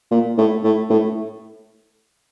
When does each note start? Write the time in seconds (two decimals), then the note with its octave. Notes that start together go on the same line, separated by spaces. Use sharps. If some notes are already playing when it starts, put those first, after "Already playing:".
0.11 A#2
0.38 A2
0.64 A2
0.90 A2